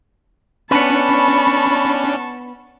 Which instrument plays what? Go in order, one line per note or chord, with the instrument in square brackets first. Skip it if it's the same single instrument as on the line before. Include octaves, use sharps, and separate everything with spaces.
[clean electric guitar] B3 B4 [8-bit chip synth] C#4 D4 [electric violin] A5 C#6 [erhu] B5